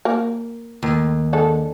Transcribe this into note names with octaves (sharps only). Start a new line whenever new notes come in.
A#3 A#4
D#2
D3 G#3 A4